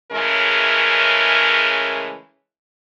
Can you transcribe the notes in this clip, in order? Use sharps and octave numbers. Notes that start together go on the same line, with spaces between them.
C#3 E3 G#3 A3 C#4 A#4